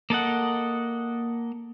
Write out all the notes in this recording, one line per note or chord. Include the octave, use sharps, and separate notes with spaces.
A#3 A4 D#5 F#5